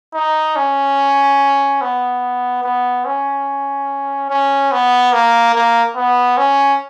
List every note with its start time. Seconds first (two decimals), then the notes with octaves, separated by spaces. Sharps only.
0.14 D#4
0.56 C#4
1.81 B3
2.64 B3
3.05 C#4
4.30 C#4
4.72 B3
5.13 A#3
5.55 A#3
5.96 B3
6.38 C#4